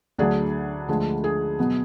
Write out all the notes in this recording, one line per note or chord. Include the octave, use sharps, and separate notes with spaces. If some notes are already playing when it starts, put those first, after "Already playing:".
D2 D3 F#3 D4 G#4
D2 D3 F3 G#3
G#4
B2 F#3 B3